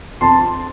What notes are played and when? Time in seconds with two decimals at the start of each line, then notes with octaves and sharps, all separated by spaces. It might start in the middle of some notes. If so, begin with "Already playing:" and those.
0.21 F2 A5 C6